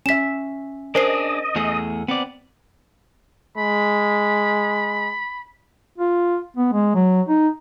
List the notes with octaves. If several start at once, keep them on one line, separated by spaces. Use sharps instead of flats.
C#4 E5 B6 E7
D4 G#4 A#4 C5 D#5 C7
E2 A3 G#4
B3 C4 D5
G#3 B5
F4
B3
G#3
F#3
D#4